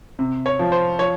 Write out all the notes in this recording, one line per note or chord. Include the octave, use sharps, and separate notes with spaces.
C3
C#5
F3
C5
F3 C#5